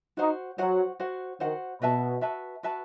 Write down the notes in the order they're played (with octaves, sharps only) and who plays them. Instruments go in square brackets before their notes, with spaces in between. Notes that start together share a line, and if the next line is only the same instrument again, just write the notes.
[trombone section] D#4 [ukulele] F#4 C5 F#5
[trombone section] F#3 [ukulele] F#4 C5 F#5
[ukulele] F#4 C5 F#5
[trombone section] D#3 [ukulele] F#4 C5 F#5
[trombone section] B2 [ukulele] F#4 B4 E5 A5
[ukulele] F#4 B4 E5 A5
F#4 B4 E5 A5